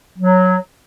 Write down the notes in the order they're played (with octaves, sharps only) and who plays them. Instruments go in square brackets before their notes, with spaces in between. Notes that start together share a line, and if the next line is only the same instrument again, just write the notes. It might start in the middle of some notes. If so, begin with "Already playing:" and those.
[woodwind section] F#3